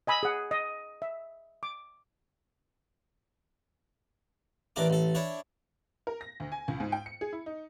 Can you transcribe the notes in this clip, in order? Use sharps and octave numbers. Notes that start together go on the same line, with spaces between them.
D#5 G#5 B5 E6
G#4 F#5
D#5
E5
D6
A1 E3 D4 A#4 D6
A1 A4
D4 E4 C#5
A#4
A#6
D2
G#5
C#2
G#2
G5
C#7
G#4
E4
D#4